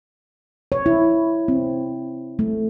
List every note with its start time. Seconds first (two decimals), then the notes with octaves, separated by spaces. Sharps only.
0.72 C#5
0.86 E4
1.48 C4
2.39 A3